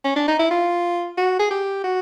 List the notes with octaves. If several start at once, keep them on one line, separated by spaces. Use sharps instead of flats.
C#4
D4
D#4
E4
F4
F#4
G#4
G4
F#4